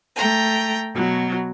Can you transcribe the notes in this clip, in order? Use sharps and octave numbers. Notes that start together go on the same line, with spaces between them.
A3 G5 A#5
B2 F#3